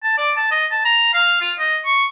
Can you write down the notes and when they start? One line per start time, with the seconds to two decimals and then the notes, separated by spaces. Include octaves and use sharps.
0.04 A5
0.18 D5
0.36 A5
0.51 D#5
0.71 A5
0.85 A#5
1.14 F5
1.41 F4
1.59 D#5
1.85 C#6